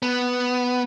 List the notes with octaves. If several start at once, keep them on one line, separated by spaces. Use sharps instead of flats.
B3